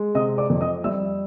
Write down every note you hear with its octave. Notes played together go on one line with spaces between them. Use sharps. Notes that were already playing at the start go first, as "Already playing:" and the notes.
Already playing: G#3
C3 D#5 D#6
D5 D6
F2
D#5 D#6
G3 E5 E6